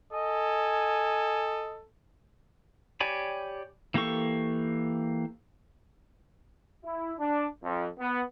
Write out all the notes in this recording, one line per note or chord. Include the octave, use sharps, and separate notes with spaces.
A4 D#5 G#5
G4 C#5 D5 G#5 B5
E3 A#3 G4 A4 C#6
E4
D4
F2
B3